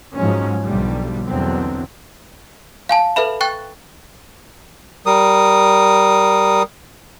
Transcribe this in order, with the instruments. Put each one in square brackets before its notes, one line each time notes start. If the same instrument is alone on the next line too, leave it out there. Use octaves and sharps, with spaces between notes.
[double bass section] G#2 F3 F#3 G#3 C#4
B1 D3 F3 G3
E2 B2 D3 F#3 C4
[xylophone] F5 G#5 A5
A4 B4 E5 B5
G5 C#6 F#6 A6
[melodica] G3 A#4 D#6